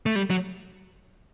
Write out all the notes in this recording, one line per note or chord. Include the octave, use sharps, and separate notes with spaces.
A3
G3
F#3